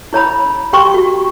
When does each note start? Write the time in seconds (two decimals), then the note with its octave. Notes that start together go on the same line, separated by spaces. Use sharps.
0.13 E4 C#5 A#5 B5
0.73 G4 G5 C6 C#6
0.94 F#4